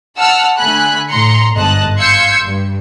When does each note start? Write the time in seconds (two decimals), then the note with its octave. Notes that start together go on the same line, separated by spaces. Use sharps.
0.19 F#5 A5 E6 F6
0.57 D3 A3 G#5 B5 F#6
1.11 A2 A#5 C6 C#7
1.55 G1 G#2 D#5 A5 F#6
1.99 F5 C6 E6 G6 G#6 C#7
2.45 G2